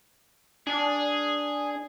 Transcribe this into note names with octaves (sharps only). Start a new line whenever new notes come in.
D4 G#4